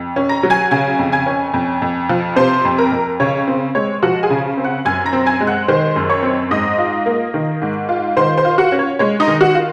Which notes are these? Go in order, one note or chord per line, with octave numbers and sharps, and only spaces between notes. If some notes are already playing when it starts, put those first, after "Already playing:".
Already playing: F2
C#4
A#5 A#6
F#3
G#5 G#6
C#3 G#5 G#6
F2
G#5 G#6
C#4
F2
F2
F3
C3 C5 C6
F2
A#4 A#5
F2
C#3 C#5
C4
G#3 C#5
F3 F#4 F#5
G#4 G#5
C#3
C4
F#5 F#6
F#2 G#5 G#6
A#5 A#6
C4
G#5 G#6
G#3
F#5 F#6
D#3 C5 C6
F#2
C#5 C#6
C4
G#2 D#5 D#6
F4
A#3
D#3
G#2
F4
D#3 C5 C6
C5 C6
F4
F#4 F#5
C#4
C#5
G#3 C#5
D#4 D#5
D#3
F#4 F#5
F4